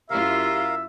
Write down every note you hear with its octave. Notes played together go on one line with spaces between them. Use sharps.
F#2 E4 F4 G4 A#4 E5 F5